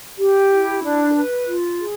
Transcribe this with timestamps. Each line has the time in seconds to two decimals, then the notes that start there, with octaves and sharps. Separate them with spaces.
0.18 G4
0.50 E4
0.83 D4
1.14 B4
1.47 F4
1.78 G#4